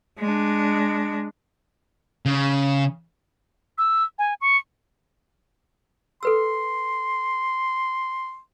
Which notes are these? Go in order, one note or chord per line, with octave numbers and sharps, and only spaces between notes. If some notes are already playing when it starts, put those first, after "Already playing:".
G#3 D4
C#3
E6
G#5
C#6
A4 B4 C6 E6